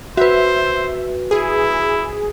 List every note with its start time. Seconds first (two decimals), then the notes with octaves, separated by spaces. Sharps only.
0.17 F#4 B4 C5 E5
1.31 E4 G#4